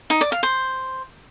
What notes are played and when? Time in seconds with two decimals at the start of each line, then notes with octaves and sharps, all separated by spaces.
0.10 D#4
0.21 D5
0.32 F5
0.43 C5